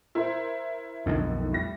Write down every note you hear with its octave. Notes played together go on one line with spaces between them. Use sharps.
E4 A#4 C5
B1 F2 D3 D#3 D#4
A2 G3 A#6